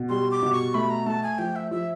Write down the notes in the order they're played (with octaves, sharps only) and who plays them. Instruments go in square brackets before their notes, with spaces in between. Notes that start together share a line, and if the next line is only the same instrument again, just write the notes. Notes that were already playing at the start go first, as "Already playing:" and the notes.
Already playing: [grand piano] B2
[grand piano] G3 [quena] C6
[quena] D6
[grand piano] B2
[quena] C#6
[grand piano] A3 [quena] B5
[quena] A#5
[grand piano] A3 [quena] A5
[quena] G#5
[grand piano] F3 [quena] G5
[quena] E5
[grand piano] F3 [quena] E5